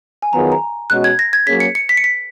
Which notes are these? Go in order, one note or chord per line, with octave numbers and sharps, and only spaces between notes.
G#5
D#3 F#3 B3 F4 G#4 A#5
A#5
B2 G#3 C#4 F#4 F#6
G#6
A#6
G#6
F#3 A#3 C#4 G#4 B6
C#7
C#7
B6
C#7
B6